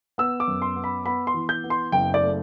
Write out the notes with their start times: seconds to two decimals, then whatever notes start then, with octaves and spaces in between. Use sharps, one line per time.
0.18 B3 E6
0.40 D6
0.48 F#2
0.62 C6
0.76 B3
0.84 B5
1.06 B3 B5
1.27 C6
1.34 E3
1.49 G6
1.64 B3
1.70 C6
1.92 F#1 G5
2.14 D5
2.22 A3